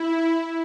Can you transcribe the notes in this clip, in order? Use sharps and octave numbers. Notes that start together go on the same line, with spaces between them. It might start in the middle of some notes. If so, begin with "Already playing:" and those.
Already playing: E4